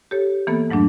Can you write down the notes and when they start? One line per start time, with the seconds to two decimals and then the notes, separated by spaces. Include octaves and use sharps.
0.11 G4 A4 C#5
0.47 E3 A#3 B3 A4
0.69 F2 G#2 F#3 A3 D4